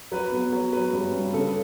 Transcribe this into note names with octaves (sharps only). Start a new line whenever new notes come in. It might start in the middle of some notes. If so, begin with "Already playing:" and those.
F#3 B4
B3
F#3
F#3 B4
G2
G2
C#3 A4